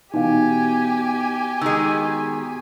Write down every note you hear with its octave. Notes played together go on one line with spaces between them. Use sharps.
B2 E3 D#4 G4 F5 G#5
D#3 G#3 E6